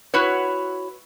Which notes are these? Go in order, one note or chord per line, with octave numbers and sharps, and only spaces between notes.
E4 F#4 B4 C#5